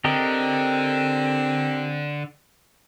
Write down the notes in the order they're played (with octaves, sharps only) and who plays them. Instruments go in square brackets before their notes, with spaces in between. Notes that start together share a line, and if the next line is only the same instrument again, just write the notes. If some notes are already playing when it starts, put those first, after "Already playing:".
[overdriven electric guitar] D3 [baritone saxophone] C4 [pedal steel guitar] G4 A#4 D#5